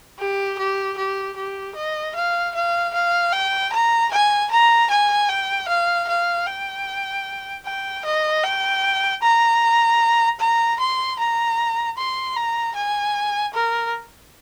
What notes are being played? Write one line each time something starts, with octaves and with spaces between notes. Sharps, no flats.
G4
G4
G4
G4
D#5
F5
F5
F5
G5
A#5
G#5
A#5
G#5
G5
F5
F5
G5
G5
D#5
G5
A#5
A#5
C6
A#5
C6
A#5
G#5
A#4